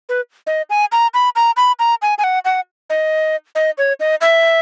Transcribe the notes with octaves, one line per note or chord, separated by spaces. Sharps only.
B4
D#5
G#5
A#5
B5
A#5
B5
A#5
G#5
G#5
F#5
F#5
D#5
D#5
C#5
D#5
E5